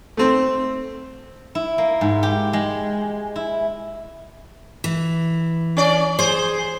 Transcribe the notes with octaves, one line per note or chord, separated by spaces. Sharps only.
A3 C4
E4
A#3
G#2
G4
G#3
E4
E3
C#4 D5
G#4 C5